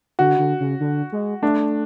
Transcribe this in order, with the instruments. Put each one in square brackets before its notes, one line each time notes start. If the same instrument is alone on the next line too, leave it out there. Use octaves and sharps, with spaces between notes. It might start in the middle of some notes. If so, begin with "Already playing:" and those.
[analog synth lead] D3 [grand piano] F#4
[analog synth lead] D3
C#3
D3
G#3
[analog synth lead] A3 [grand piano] D4